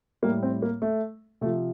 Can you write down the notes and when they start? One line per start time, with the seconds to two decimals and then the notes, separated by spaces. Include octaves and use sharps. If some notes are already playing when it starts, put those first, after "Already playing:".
0.22 A2 G3 A#3
0.43 C4
0.62 A#3
0.82 A3
1.41 C3 A3
1.45 F3